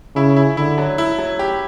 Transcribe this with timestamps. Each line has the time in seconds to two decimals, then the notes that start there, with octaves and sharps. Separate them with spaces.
0.16 C#3 E4
0.36 E4
0.57 D3 E4
0.78 F#3
0.98 E4
1.18 F#3
1.39 G4